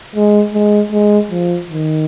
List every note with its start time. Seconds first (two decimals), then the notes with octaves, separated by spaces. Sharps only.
0.15 G#3
0.54 G#3
0.92 G#3
1.31 F3
1.69 D#3